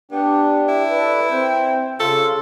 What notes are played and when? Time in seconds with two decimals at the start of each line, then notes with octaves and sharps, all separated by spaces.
0.12 B3 D4 G4
0.69 E4
0.90 A4 B4 D5
1.30 C4 G5
2.00 C#3 F4 A4